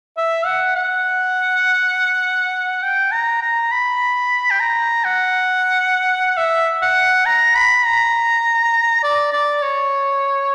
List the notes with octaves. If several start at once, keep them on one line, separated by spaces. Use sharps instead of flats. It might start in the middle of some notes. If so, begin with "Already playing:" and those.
E5
F#5
F#5
G5
A#5
A#5
B5
G5
A#5
F#5
E5
F#5
A#5
B5
A#5
D5
D5
C#5